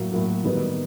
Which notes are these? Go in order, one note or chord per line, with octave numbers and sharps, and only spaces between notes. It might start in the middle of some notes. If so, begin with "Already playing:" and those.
Already playing: A2 F#3 A#3
A2 F#3 A#3
D#3 G3 B3 D#4